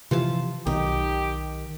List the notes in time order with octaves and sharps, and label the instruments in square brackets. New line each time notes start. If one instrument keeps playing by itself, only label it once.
[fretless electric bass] C3 E3 F3 [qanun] F4 A5
[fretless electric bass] B1 [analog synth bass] D#3 [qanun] D#4 [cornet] G4